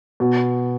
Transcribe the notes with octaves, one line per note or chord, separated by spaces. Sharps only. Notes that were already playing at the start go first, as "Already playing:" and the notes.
B2